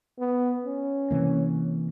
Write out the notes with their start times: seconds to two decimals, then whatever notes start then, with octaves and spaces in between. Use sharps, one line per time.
0.19 B3
0.65 C#4
1.11 C3 E3 A#3